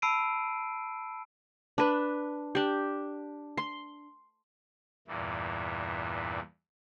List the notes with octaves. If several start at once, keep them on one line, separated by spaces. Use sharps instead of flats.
A5 B5 E6 C7 D7 D#7
D4 B4
D4 G4
C6
E2 G2 A#2 E3